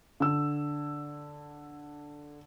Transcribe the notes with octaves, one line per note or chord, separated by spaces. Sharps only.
D3 E6